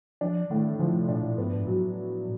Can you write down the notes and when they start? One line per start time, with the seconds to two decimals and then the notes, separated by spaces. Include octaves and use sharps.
0.21 F3 D4
0.50 A2 D#3
0.79 D3 F3
0.94 C3
1.08 A#2 D4
1.23 A#2
1.38 G#2 B3
1.46 G2
1.53 G#2
1.67 A2 F#3